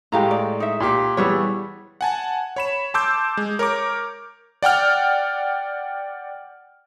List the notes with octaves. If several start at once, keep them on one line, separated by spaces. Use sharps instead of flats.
A2 G#3 G4 F5 A#5
D5
D#4 E5
A#2 G4 D6
E3 G3 B3 E4 G#4 C#5
F#5 G#5 A5
C#5 B5 E7
A5 C6 D6 E6 G6
G#3
A#4 C#5 A#5 D6
D5 F#5 G5 F6